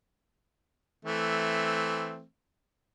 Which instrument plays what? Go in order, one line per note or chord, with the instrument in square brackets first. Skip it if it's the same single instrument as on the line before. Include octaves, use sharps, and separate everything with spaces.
[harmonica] E3 A3 C4